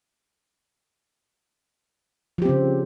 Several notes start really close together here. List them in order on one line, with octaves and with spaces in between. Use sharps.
F3 G4 C4 C#3